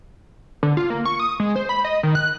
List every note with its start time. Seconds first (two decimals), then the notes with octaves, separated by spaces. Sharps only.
0.63 D3
0.77 F4
0.90 A#3
1.06 C#6
1.20 D#6
1.40 G#3
1.56 C5
1.69 B5
1.85 D#5
2.03 D#3
2.15 F#6